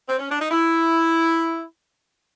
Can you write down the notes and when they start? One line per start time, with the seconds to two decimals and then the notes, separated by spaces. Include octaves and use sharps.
0.09 C4
0.19 C#4
0.30 D4
0.40 D#4
0.50 E4